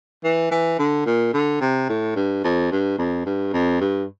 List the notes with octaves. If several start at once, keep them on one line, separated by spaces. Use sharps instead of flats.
E3
E3
D3
A#2
D3
C3
A2
G2
F2
G2
F2
G2
F2
G2